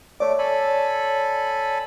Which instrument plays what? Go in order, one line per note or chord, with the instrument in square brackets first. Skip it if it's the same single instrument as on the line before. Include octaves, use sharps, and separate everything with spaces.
[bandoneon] A3 D6 [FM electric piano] C#5 D5
[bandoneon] A4 G#5 B5